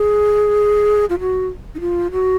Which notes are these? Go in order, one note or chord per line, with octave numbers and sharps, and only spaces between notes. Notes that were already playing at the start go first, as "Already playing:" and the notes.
Already playing: G#4
F4
F#4
D#4
F4
F#4